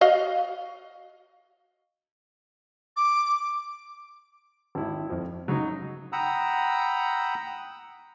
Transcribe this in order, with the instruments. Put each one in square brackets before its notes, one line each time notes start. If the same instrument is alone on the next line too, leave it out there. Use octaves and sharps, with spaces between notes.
[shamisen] F#4 D#5 F5
[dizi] D6
[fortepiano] G#1 E4
[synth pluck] F2 F3
[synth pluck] C#3 [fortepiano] F#3 D#4
[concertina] F#5 G5 A#5 B5 D#6 E6